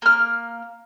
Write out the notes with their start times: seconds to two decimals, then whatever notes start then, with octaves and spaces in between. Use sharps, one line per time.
0.02 A#3 F6